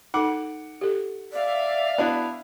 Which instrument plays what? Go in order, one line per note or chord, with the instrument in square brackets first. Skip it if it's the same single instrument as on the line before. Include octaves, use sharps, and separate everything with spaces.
[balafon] D#4 A4 [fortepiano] F#5 D6
[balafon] G4 A4
[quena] D5 [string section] E5 F5
[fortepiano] B3 D4 E4